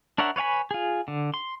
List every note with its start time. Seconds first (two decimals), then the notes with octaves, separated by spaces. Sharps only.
0.18 D4 A#4 C#5 E5 F#5
0.36 B4 C#5 F5 G#5 B5
0.71 F4 G#4
1.08 D3
1.34 C6